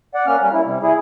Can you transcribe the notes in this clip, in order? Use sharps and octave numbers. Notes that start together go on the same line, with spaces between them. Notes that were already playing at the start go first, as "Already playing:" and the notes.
D5 F#5
A#3 C#4 F6
G3 A#3 C#4
E4
C3 G3
E4 G#4